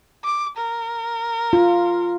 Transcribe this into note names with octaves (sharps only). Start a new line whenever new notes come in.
D6
A#4
F4